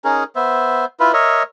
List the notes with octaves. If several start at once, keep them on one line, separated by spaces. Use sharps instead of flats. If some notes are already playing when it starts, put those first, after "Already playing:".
C#4 D#4 G#4 A#4
B3 C5 E5
E4 F4 B4
A#4 C#5 D#5 E5